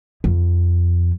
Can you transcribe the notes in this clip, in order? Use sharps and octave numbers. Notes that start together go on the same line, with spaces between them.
F2